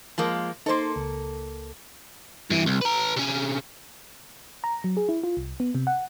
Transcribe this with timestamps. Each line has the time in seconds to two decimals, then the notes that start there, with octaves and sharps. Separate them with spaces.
0.18 F3 G#3 A#3
0.66 A#3 D#4 A4 C5 C6
0.96 C#2
2.50 G2 E3
2.66 C2
2.81 B4 A#5
3.16 C3 C#4
4.64 A#5
4.84 F#3
4.97 G#4
5.09 E4
5.23 F4
5.37 C2
5.60 B3
5.75 C3
5.87 F#5